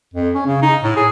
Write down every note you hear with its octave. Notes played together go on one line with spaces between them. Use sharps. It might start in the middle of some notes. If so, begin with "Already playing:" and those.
F2
C#4
C#3
D#4
A2
G#4